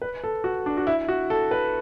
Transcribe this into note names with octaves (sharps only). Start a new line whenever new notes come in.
B4
A4
F#4
D4
F#4
E4
F#4
A4
B4